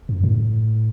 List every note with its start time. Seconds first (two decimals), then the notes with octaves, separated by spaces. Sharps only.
0.09 F#2
0.24 A2